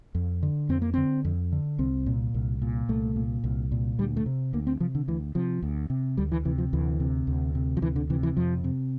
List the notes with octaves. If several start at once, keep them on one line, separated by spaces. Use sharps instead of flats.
F2
D3
F2 C4
A#3
D3 C4
F2
D3
C2 C4
A#2
C2
A#2
C2 A3
A#2
C2
A#2
D2 G3
A3
C3
D2 A#3
C4
C3 F3
D3
D2 E3
C3 F3
D2
C3
D2 G3
E3
C3 E3
F3
D2 E3
C3
D2
C3
F3
D2 E3
D3
C3 E3
E3
F2 F3
C3